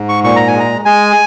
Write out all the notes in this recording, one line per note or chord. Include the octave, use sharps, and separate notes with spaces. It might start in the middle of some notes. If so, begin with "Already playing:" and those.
Already playing: G#2
C#6
A#2 C#6
A#5
G#5
G#3 A#5
G#3 G#5